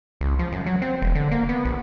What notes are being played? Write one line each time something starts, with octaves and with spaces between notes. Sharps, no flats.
C#2
F3
F#2
F#3
C4
E1
D3
A#3
B3
A#1